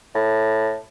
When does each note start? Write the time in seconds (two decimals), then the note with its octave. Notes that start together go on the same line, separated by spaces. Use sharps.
0.15 A2